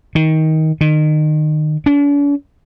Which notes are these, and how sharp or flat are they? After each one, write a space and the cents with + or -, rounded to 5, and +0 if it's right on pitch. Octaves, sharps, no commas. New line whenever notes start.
D#3 +20
D#3 -25
D4 -45